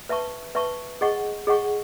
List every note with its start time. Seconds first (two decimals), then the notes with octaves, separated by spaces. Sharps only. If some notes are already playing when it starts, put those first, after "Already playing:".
0.09 B4 E5 A5 C#6
0.55 B4 E5 A5 C#6
1.01 G#4 D#5 F#5 C#6
1.47 G#4 D#5 F#5 C#6